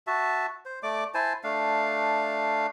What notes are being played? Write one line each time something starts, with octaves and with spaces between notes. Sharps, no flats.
F#4 E5 A5
C5
A3 D5 D6
E4 C5 G#5 A5
A3 D4 F5